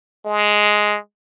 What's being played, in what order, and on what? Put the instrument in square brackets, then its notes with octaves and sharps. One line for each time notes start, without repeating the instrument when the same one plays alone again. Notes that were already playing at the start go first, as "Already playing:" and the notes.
[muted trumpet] G#3